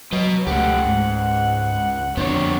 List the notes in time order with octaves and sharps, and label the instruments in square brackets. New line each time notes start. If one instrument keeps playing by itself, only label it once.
[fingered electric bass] F#3 [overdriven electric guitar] B4 D#5
[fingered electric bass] C#2 [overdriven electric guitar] A3 G4 [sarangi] F#5
[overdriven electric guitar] G#2
[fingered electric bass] F2 D3 [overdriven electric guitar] B3 D4 [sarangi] C#5